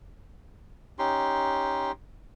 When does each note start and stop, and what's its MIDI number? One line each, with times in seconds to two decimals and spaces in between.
0.99 1.92 61
0.99 1.92 63
0.99 1.92 67
0.99 1.92 84